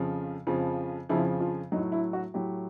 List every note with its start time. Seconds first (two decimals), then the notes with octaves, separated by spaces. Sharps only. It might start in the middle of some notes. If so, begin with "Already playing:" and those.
Already playing: F2 C#3 F3
0.47 F2 C#3 F3
1.09 F2 C#3 F3 E4
1.40 F4
1.72 F#3 D#4
1.76 A2
1.92 E4
2.13 F#4
2.34 A2 F#3 G4